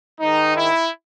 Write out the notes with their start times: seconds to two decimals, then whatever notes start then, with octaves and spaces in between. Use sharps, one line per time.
0.20 G#2 D#3 D#4
0.55 E4